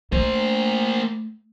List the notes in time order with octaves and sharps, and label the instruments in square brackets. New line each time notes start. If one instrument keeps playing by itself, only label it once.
[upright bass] A3 [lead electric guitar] A#3 C5